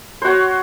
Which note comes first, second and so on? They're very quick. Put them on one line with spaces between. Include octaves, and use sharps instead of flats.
C5 F#4 C#5